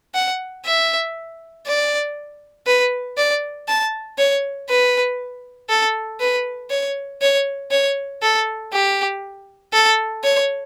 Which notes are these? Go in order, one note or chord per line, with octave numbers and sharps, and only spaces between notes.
F#5
E5
D5
B4
D5
A5
C#5
B4
A4
B4
C#5
C#5
C#5
A4
G4
A4
C#5